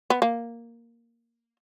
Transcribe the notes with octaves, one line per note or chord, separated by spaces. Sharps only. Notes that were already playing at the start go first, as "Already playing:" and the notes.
B3
A#3